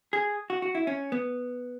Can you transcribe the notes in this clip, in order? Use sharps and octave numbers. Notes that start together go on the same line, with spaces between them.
G#4
F#4
F#4
E4
C#4
B3